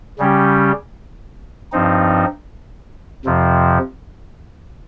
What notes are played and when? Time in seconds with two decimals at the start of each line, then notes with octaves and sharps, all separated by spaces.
0.19 C#3 G3 C#4 G4
1.72 G2 F3 C4 D#4
3.25 F2 C3 F3